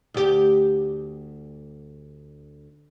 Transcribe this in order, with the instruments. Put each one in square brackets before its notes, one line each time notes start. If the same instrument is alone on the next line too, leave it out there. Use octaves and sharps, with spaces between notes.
[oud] D2 G4